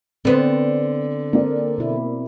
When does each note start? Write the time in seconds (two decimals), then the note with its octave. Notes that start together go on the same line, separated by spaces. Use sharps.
0.25 D3 B3 C4 C5
1.33 A#3 C4 A#4 D5
1.78 B2 E4